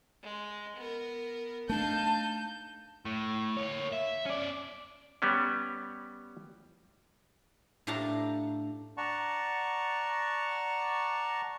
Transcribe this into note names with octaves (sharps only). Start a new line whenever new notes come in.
G#3
B3 A#4
A3 D4 D#4 F5 A5 G6
A2
A#3 C#5
E5
C#4 D5
G3 B3 C#4
A2 D4 G4 F5 A5 A#5
D5 F#5 A5 A#5 C#6